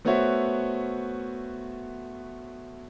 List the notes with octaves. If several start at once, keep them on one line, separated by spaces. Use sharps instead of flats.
A3 B3 F#4 C5 C#5 E5